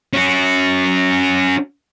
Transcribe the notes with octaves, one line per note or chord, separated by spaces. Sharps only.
C#4 F#4